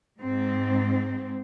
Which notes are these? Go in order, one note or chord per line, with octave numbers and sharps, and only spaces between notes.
G#2 C4